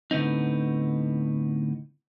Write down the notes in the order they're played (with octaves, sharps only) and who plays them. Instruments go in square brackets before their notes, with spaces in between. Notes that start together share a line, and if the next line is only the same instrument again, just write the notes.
[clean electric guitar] A2 D3 B3 C4 D#4